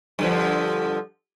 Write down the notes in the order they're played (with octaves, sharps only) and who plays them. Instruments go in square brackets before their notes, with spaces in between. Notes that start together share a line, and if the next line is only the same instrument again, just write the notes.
[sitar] G2 D3 F3